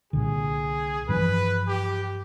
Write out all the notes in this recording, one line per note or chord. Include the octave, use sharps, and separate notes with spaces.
C2 A#2 D3 G#4
G2 E3 F3 B4
G4